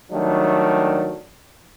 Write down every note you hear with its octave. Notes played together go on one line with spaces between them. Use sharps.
D#3 F#3 G3 A3 D4